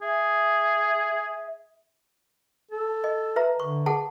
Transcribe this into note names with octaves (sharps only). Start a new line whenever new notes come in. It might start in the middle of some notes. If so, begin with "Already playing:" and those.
G#4 E5
A4
D#5
B4 E5 A#5
D3 C#6
G#4 F#5 A5